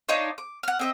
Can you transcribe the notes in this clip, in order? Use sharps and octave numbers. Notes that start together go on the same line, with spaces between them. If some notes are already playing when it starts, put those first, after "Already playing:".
D4 D#4 F4 C#5
D6
F#5 F6
C4 D#5 E5